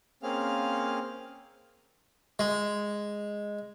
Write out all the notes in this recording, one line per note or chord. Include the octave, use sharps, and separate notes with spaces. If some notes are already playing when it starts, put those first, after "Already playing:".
A#3 C4 C#4 G#4 F5 F6
G#3